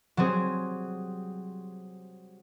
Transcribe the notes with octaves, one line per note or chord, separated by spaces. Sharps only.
F#3 G3 C4 G#4